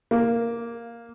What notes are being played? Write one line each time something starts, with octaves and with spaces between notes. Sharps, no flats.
A#3